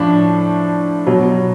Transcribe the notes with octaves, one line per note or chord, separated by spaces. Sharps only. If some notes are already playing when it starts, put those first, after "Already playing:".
Already playing: A2 F3 D4
B2 F#3